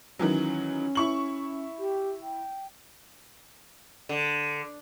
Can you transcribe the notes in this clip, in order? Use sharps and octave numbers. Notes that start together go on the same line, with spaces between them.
D#3 E3 F#3 C#4
E4 C#6 F#7
G4
G5
D3